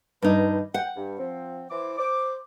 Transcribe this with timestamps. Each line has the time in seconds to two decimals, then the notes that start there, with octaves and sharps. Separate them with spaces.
0.22 G2 D#3 D#4 B4
0.74 F#5 G5
0.96 G2
1.19 F3 C4
1.71 E3 C5 D6
1.98 C5 D6